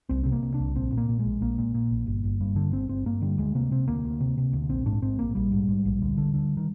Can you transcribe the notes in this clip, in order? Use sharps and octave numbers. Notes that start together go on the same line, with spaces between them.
C2 C4
C3 C4
A#3
C3
D4
C2
A#1 C4
A#2
A#3
A#2
G#3
A#1
A#1 A#3
A#2
A#2
A#1
G1
G1
G2
D3
G1 C4
G1 C4
G2 A#3
D3 G3
D2 G#3
C3 A#3
C3 C4
D2 A#3
D2
C3
C3
D2
A#1 C4
G#2 D4
G#2 C4
A#1 A#3
A#1 G3
G#2
G#2
A#1
D2
D3
D3
D#3